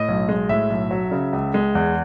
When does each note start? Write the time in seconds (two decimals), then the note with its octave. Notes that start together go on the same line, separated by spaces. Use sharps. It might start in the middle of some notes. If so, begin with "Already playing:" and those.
Already playing: A2 D#5
0.08 B1
0.29 G#3
0.49 A2 E5
0.70 B1
0.91 F#3
1.12 C#3
1.33 C#2
1.54 G#3
1.75 E2